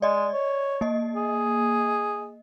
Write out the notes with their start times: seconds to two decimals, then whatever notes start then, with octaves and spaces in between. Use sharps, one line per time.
0.02 G#3 D5 D#5
0.33 C#5
0.81 A#3 D#5
1.16 G#4